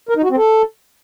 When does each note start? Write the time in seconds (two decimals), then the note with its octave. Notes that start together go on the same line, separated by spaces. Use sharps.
0.09 A#4
0.16 D#4
0.23 F#4
0.30 C4
0.37 A4